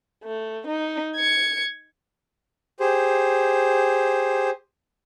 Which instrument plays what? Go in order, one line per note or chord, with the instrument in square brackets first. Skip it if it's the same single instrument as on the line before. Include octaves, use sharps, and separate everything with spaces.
[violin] A3
D#4
G#6 C#7
[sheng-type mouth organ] G4 G#4 C5